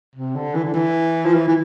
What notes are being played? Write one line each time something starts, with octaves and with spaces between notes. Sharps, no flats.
C3
D3
E3
D3
E3
F3
E3
E3